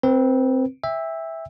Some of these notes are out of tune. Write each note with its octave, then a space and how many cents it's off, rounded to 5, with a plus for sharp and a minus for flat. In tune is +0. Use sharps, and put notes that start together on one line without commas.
C4 +0 B4 -30
E5 -5 G5 +35